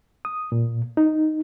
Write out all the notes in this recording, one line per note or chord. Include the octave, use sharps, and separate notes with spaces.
D#6
A#2
D#4